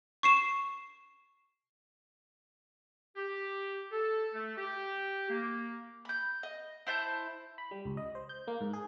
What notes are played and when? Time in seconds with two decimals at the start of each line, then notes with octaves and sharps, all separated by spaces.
0.23 C#6 C7 E7
3.16 G4
3.91 A4
4.34 A3
4.57 G4
5.29 A#3
6.05 B5 G6
6.43 D#5
6.87 E4 C5 A5 G6
7.58 B5
7.71 G3
7.85 C#2
7.97 D#5
8.15 C5
8.29 G6
8.48 A#3
8.61 G#2
8.73 G#4